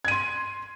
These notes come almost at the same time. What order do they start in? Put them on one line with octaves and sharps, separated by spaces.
G#6 D#7 C6